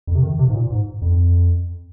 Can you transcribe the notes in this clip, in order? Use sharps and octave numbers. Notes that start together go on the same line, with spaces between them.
F2
C3
D#3
C3
G#2
A#2
G#2
F2